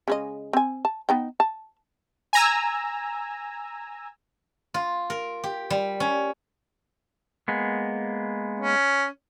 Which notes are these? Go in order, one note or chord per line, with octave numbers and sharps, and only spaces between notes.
C#3 G#3 D#5
C4 G#5
A5
B3 D#4 G5
A5
G#5 A#5 E6
F4
A#4
G4
G3
C#4
G#3 A#3 B3
C#4